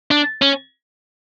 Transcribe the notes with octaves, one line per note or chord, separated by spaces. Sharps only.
D4
C#4